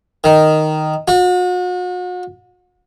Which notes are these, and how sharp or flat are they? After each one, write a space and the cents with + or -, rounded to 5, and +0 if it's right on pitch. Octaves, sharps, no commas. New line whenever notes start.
D#3 -5
F#4 -40